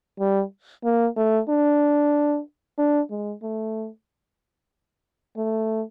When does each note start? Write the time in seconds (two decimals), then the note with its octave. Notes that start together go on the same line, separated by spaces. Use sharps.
0.20 G3
0.84 A#3
1.17 A3
1.49 D4
2.78 D4
3.11 G#3
3.43 A3
5.37 A3